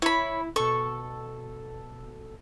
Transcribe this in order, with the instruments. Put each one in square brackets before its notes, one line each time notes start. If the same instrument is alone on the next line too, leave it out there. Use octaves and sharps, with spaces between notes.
[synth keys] E4 [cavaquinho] C#5 B5
[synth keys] B2 A4 [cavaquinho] C#6